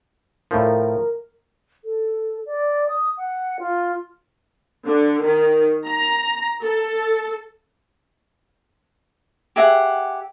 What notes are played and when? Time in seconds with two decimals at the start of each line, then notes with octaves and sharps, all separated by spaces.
0.51 A2 F3 A#4
1.84 A4
2.46 D5
2.89 D#6
3.18 F#5
3.60 F4
4.86 D3
5.23 D#3
5.85 A#5
6.62 A4
9.56 G4 G#4 E5 F#5